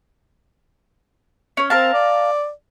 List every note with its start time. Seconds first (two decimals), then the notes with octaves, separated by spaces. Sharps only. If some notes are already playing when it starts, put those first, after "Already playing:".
1.57 C#4 C#5
1.70 C4 A#4 F5 A5
1.94 D5